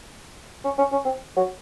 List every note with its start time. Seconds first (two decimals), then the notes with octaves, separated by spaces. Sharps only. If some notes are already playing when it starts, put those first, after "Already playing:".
0.64 C#4
0.78 C#4
0.92 C#4
1.05 C4
1.37 F#3